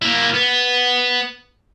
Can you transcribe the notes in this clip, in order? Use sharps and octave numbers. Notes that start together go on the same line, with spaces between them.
A#3 E4
B3